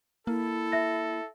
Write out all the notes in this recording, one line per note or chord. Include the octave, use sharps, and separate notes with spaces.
A#3 E4 A4
E5 A#6